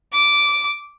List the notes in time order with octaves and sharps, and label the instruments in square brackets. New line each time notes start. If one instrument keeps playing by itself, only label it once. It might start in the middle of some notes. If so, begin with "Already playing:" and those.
[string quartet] D6